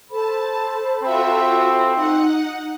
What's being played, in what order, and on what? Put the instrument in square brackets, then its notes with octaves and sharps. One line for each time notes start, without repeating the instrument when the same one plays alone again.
[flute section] A4 C5 B5 [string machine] A5
[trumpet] C4 [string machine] F4 F#4 E5
[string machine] D#4 F#5